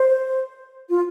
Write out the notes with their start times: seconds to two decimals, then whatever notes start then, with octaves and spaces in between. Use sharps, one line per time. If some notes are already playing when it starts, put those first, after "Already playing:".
Already playing: C5
0.89 F4